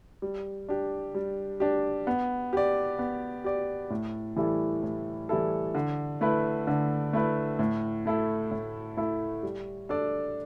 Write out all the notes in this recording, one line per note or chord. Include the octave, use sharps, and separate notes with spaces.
G3
D4 G4
G3
D4 G4
B3
G4 D5
B3
G4 D5
A2
E3 G3 E4 A4
A2
E3 G3 E4 A4
D3
A3 E4 B4
D3
A3 E4 B4
A2
A3 E4 A4
A2
A3 E4 A4
G3
D4 A4 D5